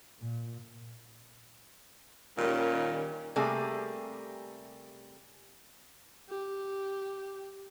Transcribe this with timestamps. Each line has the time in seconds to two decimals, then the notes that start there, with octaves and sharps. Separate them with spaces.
0.20 A#2
2.38 A#2 D#3 G3 C#4
3.36 C3 G3 A3 A#3 G#4
6.29 G4